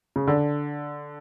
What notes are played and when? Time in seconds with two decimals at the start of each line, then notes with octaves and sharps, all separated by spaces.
0.16 C#3
0.27 D3